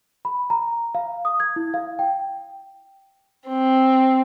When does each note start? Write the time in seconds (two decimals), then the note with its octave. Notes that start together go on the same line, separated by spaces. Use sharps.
0.25 B5
0.50 A#5
0.95 F5
1.25 D#6
1.40 G#6
1.56 E4
1.74 F5
1.99 G5
3.48 C4